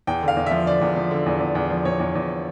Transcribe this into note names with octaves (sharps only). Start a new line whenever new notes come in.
E2 G5
D3
F5
E2
F3 E5
D3 D5
E2
F3
D3
E2
E2
E2
F3
E2 C#5
E2
E2